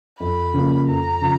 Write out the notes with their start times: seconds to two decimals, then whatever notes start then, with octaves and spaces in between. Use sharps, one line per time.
0.20 F2 B5
0.54 C#3 F3 A#3
0.88 F2 A#5
1.21 C#3 F3